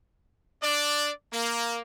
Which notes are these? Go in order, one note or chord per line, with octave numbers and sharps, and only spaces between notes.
D4 D5
A#3